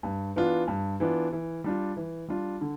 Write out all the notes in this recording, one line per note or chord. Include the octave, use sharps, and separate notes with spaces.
G2
E3 B3 D4 F4
G2
E3 B3 D4 F4
E3
G3 D4 F4
E3
G3 D4 F4
D3